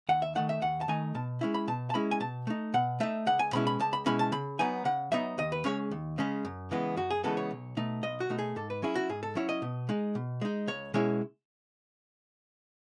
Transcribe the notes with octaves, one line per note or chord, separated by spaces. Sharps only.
D#2 F#5
E5
D#3 A3 D#4 F#5
E5
D#2 F#5
A5
D#3 A3 D#4 G#5
B2 A5
G#3 C#4 E4
B5
B2 A5
A5
G#3 C#4 E4 B5
G#5
B2 A5
A3 D#4
B2 F#5
A3 D#4 E5
C#2 F#5
G#5
B2 G#3 C#4 E4 B5
B5
C#2 A5
B5
B2 G#3 C#4 E4 B5
A5
C#3 B5
F#3 B3 D#4 G#5
C#3 F#5
F#3 B3 D#4 E5
D#2 D#5
B4
C#3 G#3 C#4 C#5
D#2
C#3 G#3 C#4
F#2
C#3 E3 G#3 B3
F#2 F#4
G#4
C#3 E3 G#3 B3 A4
C#5
B1
B2 A3 D#4
B1 D#5
F#4
B2 A3 D#4
G#4
G#2 A4
B4
F#3 C#4 E4 G#4
F#4
G#2 G#4
A4
F#3 C#4 E4 C#5
D#5
B2
G#3 D#4
B2
G#3 D#4
C#2 C#5
B2 G#3 C#4 E4 C#5